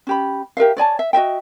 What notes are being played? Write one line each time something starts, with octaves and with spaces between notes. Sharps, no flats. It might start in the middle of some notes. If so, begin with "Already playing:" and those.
C#4 G4 B5
G4 A#4 E5 F5
C#5 D5 G#5 A5
E5
F#4 D#5 E5 G5